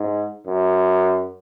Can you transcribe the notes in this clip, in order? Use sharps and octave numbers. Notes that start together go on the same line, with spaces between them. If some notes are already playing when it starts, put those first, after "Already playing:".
Already playing: G#2
F#2